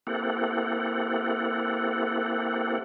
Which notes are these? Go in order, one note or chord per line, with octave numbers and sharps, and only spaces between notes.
A#3 C4 E4 G4 A4 F#5